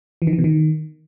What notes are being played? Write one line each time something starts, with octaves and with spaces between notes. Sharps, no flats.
E3
D#3
E3
B2
D#3